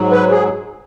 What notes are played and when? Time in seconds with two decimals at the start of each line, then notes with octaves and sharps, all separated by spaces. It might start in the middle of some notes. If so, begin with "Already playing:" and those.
Already playing: G#2 F#3
0.12 B4
0.31 G#4